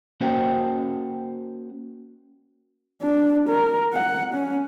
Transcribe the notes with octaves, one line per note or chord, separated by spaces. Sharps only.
A#3 C#4 F#4 C5 F#5 G5
D4
A#4
F#5
C#4